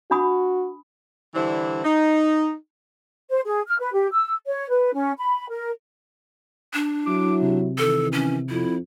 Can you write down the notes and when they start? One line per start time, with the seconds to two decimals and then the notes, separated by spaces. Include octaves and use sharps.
0.11 D4 F#4 B5 D#6
1.35 D3 E3 G3 D4 E4 C5
1.84 D#4
3.30 C5
3.45 G#4
3.67 F6
3.80 B4
3.94 G4
4.13 E6
4.47 C#5
4.70 B4
4.93 C#4
5.18 B5
5.50 A#4
6.74 D4
7.06 F#3 E4 D6
7.41 C3
7.78 D#3 E3 A4
8.13 C#4
8.49 F2 E4